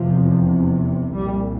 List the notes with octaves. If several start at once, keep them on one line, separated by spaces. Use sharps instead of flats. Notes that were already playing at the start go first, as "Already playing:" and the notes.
Already playing: F1 E2 C3 F3
C2 A#2 G3